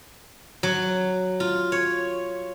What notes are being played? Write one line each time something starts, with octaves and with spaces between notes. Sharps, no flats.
F#3
F4
C#5